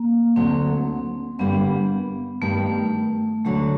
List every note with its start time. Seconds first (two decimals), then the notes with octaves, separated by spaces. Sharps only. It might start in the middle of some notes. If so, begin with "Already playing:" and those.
Already playing: A#3
0.36 D2 D3 F#3 C4
1.39 G2 D3 G3 A#3 B3
2.42 G2 D#3 G3 A3 A#3
3.45 D2 D3 F#3 G#3